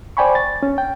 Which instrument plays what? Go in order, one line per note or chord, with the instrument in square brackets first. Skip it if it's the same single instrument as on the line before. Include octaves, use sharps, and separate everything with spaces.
[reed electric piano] C5 D5 G5 G#5 B5 C#6
A6
C#4
G5